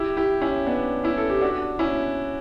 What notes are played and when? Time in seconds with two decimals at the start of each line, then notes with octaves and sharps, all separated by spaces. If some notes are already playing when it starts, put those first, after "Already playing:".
Already playing: E4 G4
0.17 E4 G4
0.42 C#4 E4
0.67 B3 D4
1.04 C#4 E4
1.18 A4
1.30 G4
1.41 D4 F#4
1.79 C#4 E4